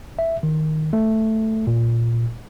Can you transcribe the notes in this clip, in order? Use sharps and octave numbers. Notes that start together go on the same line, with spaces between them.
E5
D#3
A3
A#2